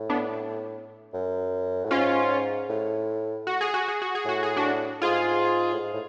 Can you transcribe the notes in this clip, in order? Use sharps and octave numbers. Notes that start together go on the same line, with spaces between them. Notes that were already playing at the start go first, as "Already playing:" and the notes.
Already playing: A2
B3 D4
F#2
A2
G#2 C#4 F4
A2
F#4
G#4
F#4
G#4
F#4
G#4
A2 F#4
G#4
D4 F#4
G#2 F4 G#4
A2
G#2
A2